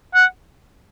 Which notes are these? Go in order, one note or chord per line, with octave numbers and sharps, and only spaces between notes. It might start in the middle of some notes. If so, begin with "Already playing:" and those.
F#5